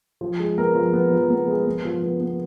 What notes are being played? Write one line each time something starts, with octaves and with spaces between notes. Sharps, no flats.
F3
G#3
B3 A#4
F3
B3
F3
B3
G#3
B3
F3
B3
B3